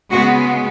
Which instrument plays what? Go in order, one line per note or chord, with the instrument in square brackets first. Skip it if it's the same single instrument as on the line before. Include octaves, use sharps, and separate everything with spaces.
[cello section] C#3 G#3 B3 F#4